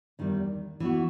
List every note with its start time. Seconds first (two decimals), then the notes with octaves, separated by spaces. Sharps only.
0.19 E2 D#3 G3
0.80 E3 B3 F#4